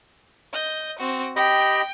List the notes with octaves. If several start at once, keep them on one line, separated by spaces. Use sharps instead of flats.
D#5 G6
C4 F#4
G4 D#5 G5 B5